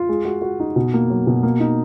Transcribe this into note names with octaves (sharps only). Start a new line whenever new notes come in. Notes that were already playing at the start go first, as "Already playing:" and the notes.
Already playing: F4
G#3
F#4
F#4
D#4
B2
A#3
F#3
B2
A#3
D#4